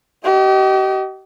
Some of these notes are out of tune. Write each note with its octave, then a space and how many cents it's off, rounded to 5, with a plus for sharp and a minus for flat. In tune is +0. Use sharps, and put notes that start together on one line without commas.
G4 -40 D#5 +0